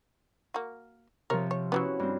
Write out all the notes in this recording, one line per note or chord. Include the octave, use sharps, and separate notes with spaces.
A#3 F#4
C3 F3 A#4 C#5
C#5
F#3 G3 B3 C#4 E4 F#4
G2 C4